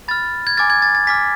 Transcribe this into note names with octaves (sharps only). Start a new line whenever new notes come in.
B5 F6 A6
G#6
G#5 D6 F6 A6
G#6
A6
A6
G#5 D6 F6 B6